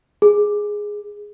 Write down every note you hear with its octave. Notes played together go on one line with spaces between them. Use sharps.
G#4